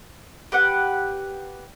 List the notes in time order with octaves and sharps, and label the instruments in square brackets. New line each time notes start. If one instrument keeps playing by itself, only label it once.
[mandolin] G4 B4 F#5